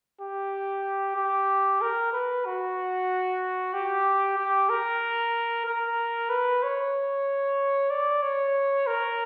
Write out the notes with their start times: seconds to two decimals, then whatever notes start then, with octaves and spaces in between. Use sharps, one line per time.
0.21 G4
1.17 G4
1.81 A#4
2.13 B4
2.46 F#4
3.74 G4
4.38 G4
4.69 A#4
5.66 A#4
6.30 B4
6.63 C#5
7.91 D5
8.22 C#5
8.87 A#4